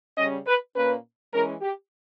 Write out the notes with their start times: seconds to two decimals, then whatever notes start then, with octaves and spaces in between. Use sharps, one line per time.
0.17 C#3 G3 C#4 D#5
0.47 B4
0.75 A#2 A#3 C#4 B4
1.33 E3 G#3 C#4 A#4
1.62 G4